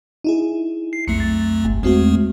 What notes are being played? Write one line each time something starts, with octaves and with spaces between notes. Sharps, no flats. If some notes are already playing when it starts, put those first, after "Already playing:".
D#4 E4 G#4
C7
B1 F2 A3 C7 C#7
A6
G1
E2 G#3 A3 C4 F#4